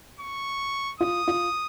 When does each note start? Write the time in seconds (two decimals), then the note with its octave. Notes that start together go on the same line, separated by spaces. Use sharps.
0.20 C#6
1.00 F4 D#6
1.28 F4